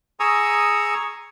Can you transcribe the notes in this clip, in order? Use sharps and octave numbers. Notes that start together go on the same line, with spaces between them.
G#4 G#5 A#5 C#6 D#6 E6